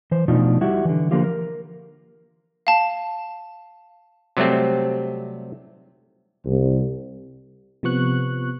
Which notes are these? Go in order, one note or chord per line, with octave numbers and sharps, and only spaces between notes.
E3 C5
B2 F3 A3 D4 D#4 F4
G3 E4 F#4 G4 E5
D3 E3
D3 F3 A#3 F4 G4
A#4
F5 A5
C3 F#3 G3 A3 C4
C2
C3 F3 B3 C#6 F#6